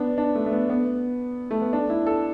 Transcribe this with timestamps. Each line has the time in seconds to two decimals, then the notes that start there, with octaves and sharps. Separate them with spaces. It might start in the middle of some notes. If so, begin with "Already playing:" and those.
Already playing: B3 D4
0.18 D4
0.35 A3
0.46 A3
0.53 B3
0.70 B3
1.51 A3
1.62 B3
1.73 D4
1.90 E4
2.07 A4